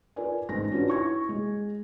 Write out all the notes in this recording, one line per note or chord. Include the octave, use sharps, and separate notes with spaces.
F4 A#4 B4 D5 G#5
A1 G#2 D#4 A#6
C#4 D4 F4 F#4 B4 C#5
E4 C#6 G#6
G#3